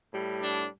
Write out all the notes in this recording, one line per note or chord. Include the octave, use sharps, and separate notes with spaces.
A2 G3
D4